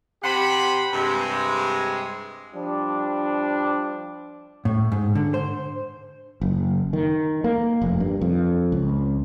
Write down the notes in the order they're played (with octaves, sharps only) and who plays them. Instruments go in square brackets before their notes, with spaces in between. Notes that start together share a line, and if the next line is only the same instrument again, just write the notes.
[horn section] C3 G4 C5 F#5 B5
G2 C3 G#3
[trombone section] F3 G3 D4
[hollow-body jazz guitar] A2
G#2
D3
C5
[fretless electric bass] F#1
D#3
A#3
F1
G2
F2
C#2